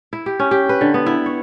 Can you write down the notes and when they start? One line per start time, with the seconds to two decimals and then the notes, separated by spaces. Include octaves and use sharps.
0.13 E4
0.26 G4
0.40 C#4
0.51 G4
0.69 B4
0.81 D3
0.94 B3
1.06 E4
1.26 C#5